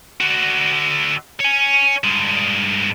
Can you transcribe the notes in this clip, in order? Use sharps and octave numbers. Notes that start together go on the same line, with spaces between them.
D3 F#4
C#5 G#5
G2 G#3